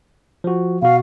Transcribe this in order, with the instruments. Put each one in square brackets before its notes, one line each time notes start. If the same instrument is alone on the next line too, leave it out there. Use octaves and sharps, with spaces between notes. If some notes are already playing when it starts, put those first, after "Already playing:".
[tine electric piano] F3 F#4
[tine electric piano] B2 F#4 [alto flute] F5